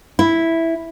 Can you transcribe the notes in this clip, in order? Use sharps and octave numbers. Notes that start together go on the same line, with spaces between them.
E4